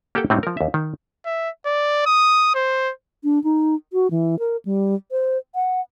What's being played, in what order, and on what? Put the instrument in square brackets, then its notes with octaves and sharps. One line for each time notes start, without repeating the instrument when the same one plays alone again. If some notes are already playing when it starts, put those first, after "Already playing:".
[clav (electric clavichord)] A#3 G4 A4 F#5 G5 A5
A2 F#3 G3 C4 D#4
F3 A#4
D#2 E5
D#3
[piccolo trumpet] E5
D5
D#6
C5
[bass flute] D4
D#4
F#4
E3
A#4
G3
C5
F#5